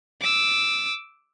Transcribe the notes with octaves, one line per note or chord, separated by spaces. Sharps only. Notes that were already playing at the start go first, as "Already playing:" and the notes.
D6 E6